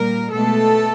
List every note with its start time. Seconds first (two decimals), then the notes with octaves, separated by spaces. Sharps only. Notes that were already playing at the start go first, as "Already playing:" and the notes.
Already playing: A#2 G3 A#3 A#4
0.31 B2 G#3 A3 B3 A4